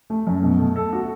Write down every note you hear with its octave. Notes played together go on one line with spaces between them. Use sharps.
A3
F#2
B2
A3
A4
F#4